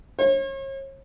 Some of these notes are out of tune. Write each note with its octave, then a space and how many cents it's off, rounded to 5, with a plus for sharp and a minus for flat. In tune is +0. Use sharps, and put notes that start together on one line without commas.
C#5 -40